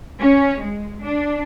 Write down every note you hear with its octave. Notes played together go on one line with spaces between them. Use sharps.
C#4
G#3
D4